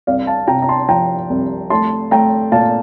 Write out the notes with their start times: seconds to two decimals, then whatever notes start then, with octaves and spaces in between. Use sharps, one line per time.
0.07 C2 D5 F5
0.27 F5 A5
0.47 C3 G5 A#5
0.62 A#5
0.69 A5 C6
0.88 F3 G5 A#5
1.30 C2
1.70 A3 A5 C6
2.11 A3 G5 A#5
2.52 A#2 F5 A5